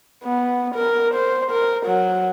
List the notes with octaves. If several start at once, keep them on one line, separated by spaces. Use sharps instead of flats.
B3
A#4
C5
A#4
F#3